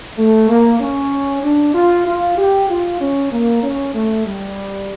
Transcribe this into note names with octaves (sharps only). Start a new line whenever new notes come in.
A3
A#3
C#4
D4
F4
F4
G4
F4
C#4
A#3
C#4
A3
G3